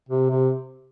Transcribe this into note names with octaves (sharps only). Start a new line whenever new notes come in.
C3
C3